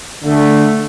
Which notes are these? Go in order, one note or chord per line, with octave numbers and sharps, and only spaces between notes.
D3 A3